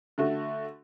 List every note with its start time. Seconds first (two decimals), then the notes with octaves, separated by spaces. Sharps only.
0.18 D3 A3 F#4